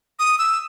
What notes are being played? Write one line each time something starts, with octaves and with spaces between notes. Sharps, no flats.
D#6
E6